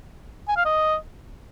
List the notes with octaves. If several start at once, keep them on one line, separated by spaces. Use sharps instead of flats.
G#5
F5
D#5